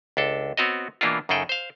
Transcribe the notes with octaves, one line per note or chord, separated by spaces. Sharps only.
C#2 D4 A4
B3 C4 F#4 C#5 D#5
B2 E3 A#3 D4 E4 F4
F#2 C#3 D#4 G#4 A4 G5
C5 F5